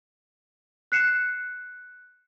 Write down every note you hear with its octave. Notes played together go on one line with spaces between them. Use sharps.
F#6 C7 C#7 E7